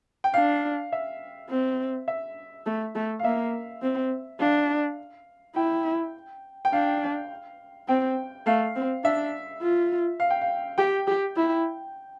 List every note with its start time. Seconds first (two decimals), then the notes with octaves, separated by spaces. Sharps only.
0.24 G5
0.34 D4 F5
0.92 E5
1.50 C4
2.08 E5
2.66 A3
2.95 A3
3.19 F5
3.24 A#3 E5
3.82 C4
4.40 D4 F5
5.56 E4 G5
6.65 G5
6.73 D4 F5
7.88 C4 G5
8.46 A3 F5
8.76 C4
9.04 D4 E5
9.62 F4
10.20 F5
10.30 G5
10.42 F5
10.78 G4 G5
11.07 G4
11.36 E4